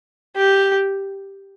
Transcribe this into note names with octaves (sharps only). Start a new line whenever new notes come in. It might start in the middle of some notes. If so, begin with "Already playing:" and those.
G4